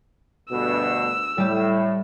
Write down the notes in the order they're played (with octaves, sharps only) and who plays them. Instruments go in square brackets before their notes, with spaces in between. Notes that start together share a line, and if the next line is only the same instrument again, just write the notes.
[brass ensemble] D2 G2 B2 [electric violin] E6
[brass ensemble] A2 [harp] G3 G4